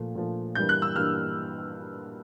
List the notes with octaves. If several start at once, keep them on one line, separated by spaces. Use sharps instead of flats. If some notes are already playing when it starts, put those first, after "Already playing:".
Already playing: A#2 F3 A3
A#2 F3 A3
G2 E3 G3 A#3 G6
F#6
E6
G2 E3 G3 A#3 F6